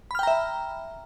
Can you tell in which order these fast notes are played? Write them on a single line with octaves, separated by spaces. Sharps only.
B5 F6 G5 A#5 E5